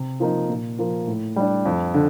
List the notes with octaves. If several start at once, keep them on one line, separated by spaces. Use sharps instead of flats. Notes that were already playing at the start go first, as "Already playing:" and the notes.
Already playing: C3
F3 A#3 D#4
A#2
F3 A#3
A2
G3 D4
F2
D3